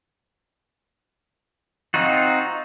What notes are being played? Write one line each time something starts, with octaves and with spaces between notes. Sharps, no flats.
C4 D#4 F4 F#4